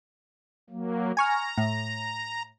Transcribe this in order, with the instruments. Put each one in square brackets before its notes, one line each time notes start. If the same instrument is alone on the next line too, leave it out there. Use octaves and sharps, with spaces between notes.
[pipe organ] F#3 A#3
[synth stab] G#5 C#6 F6 [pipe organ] A#5
[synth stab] A2